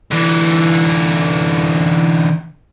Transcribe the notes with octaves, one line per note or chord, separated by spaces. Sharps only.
D3 E3